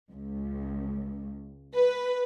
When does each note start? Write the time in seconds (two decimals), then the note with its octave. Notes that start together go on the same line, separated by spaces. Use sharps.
0.11 C#2
1.75 B4